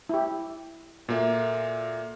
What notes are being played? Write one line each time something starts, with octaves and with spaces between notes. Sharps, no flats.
E4 G4
A#2 A#3 F#4 A4 E5